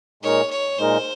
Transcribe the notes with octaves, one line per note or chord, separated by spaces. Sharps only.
A#2 G#3 D#4 A#4 C#5
C#5
A#2 G#3 D#4 A#4 C5